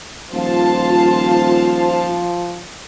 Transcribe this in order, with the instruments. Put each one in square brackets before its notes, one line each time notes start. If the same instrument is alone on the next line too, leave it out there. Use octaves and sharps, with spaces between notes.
[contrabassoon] D#1 [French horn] F3 [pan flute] F4 [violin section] C5 F5 A5